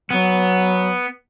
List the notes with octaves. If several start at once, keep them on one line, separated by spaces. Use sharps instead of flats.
F#3 B3